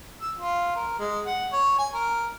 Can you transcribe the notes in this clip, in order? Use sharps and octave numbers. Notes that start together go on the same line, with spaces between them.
E6
F4
A#4
G#3
F#5
C#5
G#5
A#4